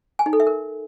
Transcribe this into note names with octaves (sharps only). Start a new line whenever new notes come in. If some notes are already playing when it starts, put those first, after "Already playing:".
G#5
D#4
A4
E5
A#4